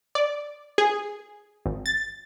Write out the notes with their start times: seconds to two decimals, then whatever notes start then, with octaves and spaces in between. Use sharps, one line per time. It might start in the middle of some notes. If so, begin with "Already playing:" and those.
0.15 D5
0.78 G#4
1.66 G#1
1.86 A6